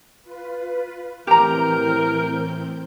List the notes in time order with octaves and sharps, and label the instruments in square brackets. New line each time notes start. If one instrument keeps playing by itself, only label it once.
[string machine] F4 B4
[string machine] A2 C4 G6 [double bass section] E3 [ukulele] G4 A#5 [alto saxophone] A#4